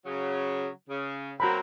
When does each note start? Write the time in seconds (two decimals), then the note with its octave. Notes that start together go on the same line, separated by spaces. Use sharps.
0.05 C#3 F#3
0.89 C#3
1.40 F#3 A#3 C4 F#4 A#5 B5